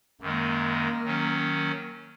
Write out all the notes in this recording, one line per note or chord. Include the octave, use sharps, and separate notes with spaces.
F#2 D#3 G#3 A#3
D#3 F#3 C#4